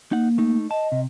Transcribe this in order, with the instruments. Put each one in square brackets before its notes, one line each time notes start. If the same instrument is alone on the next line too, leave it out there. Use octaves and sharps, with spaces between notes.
[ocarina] A#3 [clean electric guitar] D#4 F#5
[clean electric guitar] A3 D#4
[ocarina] D#5 [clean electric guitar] A5
[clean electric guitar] C3